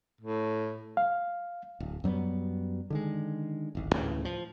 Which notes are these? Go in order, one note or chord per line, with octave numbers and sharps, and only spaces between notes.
A2
F5
D1
F#2 F#3 G3 B3
D3 D#3 G#3
D1 G#1
D2 A2 C#3 E3
F3